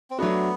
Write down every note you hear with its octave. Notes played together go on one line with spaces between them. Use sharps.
C4
F#3 A3 B3 D4 F#4